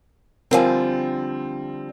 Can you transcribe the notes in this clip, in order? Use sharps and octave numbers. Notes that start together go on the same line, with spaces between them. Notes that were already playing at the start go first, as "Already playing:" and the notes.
D3 F3 G3 C4 A#4 F5 G#5